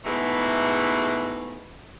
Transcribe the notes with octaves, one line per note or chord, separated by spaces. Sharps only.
G#2 B2 E3 G#3 A3